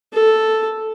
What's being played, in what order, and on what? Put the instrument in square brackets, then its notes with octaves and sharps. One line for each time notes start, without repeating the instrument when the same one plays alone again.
[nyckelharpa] A4